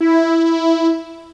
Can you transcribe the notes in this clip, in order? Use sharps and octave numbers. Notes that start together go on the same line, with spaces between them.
E4